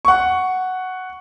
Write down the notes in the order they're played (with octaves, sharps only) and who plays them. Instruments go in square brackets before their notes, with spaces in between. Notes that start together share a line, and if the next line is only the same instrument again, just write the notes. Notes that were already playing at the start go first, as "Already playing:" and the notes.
[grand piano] F#5 C#6